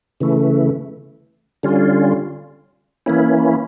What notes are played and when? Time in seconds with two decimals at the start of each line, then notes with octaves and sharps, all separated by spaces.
0.20 C#3 E3 A3
1.63 D3 G3 C#4 F4
3.06 E3 A#3 C#4 E4